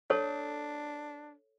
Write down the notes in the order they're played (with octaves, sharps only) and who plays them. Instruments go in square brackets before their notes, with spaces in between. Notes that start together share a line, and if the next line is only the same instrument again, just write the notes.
[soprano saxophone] D4 [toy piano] A4 C#5